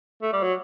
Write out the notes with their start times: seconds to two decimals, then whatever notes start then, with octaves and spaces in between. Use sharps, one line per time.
0.22 A3
0.33 G3
0.43 F#3